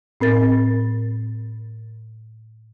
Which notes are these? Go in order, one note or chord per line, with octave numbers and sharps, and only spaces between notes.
A2 C4 A#4 A6